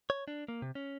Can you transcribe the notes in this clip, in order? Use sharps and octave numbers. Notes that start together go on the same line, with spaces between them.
C#5
D4
A#3
C3
C#4